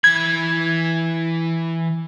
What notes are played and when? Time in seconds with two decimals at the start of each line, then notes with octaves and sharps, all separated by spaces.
0.04 E3 B5 G#6